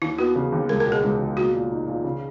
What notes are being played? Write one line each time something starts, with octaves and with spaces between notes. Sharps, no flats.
D#2 E4
B3 F#4
C#3
D#2
C#2 A#4
A#4
B2
G#4
C#2
B2
A#3 F#4
A#2
D#4
A#2
C#3